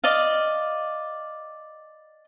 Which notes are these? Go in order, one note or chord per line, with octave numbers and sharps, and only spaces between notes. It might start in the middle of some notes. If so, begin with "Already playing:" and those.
D5 D#5 F5